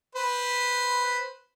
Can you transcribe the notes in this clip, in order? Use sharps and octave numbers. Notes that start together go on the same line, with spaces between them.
B4 C5